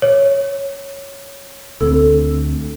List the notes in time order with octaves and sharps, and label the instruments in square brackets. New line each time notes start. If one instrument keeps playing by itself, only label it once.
[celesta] C#5
[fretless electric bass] D2 C4 [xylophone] A4